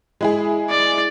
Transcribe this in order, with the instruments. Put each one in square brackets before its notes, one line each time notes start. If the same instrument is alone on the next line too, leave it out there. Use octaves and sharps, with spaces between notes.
[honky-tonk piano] G#3 E4 G#4
[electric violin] D5